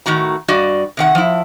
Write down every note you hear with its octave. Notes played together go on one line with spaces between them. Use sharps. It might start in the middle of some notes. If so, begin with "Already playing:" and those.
A2 D#3 F#4 A#5
G2 F#4 D5 D#5
C3 D#3 F#5
F3 E4